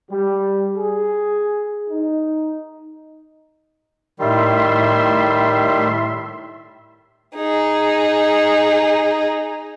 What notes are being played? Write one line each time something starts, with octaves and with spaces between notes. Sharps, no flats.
G3
G#4
D#4
A2 D#3 G3 E5 C6
D#4 G#4